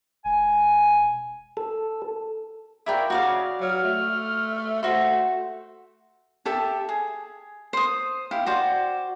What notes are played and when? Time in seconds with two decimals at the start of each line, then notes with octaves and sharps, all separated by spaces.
0.25 E1 G#5
1.57 A4
2.86 F3 E4 F#4 A#4 D5 G5
3.10 C#3 F#4 D5 F5
3.61 F#3 F6
3.84 A3
4.83 A3 F#4 C5
6.45 G4 A4 E5 A5
6.89 G#4
7.73 C5 D#6
8.31 E4 G4 F5
8.46 F#4 C5 D5 G5